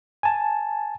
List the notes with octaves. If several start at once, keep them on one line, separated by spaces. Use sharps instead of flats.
G#5 A5